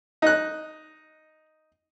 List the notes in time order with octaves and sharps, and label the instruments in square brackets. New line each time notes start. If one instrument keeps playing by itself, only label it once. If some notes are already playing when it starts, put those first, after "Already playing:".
[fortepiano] D#4 F#6